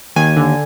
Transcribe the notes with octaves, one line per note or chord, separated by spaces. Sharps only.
D#2 G#5
D3